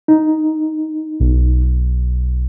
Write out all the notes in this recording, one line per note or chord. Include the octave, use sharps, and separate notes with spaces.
D#4
B1